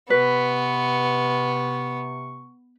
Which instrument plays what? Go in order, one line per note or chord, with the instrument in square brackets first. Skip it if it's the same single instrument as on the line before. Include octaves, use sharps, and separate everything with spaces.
[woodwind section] C3 C#6 [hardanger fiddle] B3 [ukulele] B4